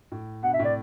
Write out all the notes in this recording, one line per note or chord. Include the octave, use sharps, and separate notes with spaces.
A2
G2 B2 F#5
E5
A2 C3
D5